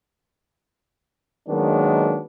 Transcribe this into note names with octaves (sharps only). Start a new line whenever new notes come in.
D#3 F#3 G#3 A#3 B3 D4